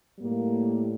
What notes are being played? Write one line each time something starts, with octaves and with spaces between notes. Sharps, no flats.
A2 G3 A#3